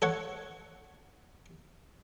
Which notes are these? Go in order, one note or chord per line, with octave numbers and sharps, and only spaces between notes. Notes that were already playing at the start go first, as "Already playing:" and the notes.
A4 C#5 F#5